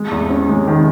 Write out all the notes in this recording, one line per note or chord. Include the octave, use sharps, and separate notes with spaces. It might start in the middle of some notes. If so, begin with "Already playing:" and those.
Already playing: G#3
E2
C#4
G#3
D#3